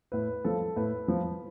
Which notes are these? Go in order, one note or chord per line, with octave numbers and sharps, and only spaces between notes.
A2 B4
F3 A4
A2 B4
F3